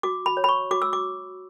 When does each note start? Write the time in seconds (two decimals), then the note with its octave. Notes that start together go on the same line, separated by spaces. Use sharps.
0.03 F#4 D6
0.26 B5
0.37 C#5
0.44 B5
0.49 C#6
0.71 F#4 D6
0.82 E6
0.93 D6